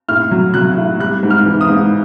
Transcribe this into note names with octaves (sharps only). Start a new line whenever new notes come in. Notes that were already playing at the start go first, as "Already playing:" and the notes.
A2 F6
F#3
F#3 F#6
A2
G3 F#6
G#2
F6
E3
D#6
G#2